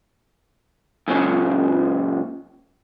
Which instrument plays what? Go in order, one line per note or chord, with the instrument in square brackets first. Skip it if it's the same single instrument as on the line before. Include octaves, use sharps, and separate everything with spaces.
[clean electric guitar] F#2 A#2 C#3